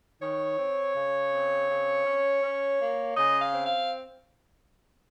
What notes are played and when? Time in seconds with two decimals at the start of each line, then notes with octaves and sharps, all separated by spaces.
0.22 D#3 C#5
0.59 C4
0.96 C#3
1.32 C4
1.70 C#3
2.06 C#4
2.43 C#4
2.80 A#3
3.16 C#3 D#5
3.42 F5
3.53 C4
3.66 F5